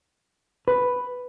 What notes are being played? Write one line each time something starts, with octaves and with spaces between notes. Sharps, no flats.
B4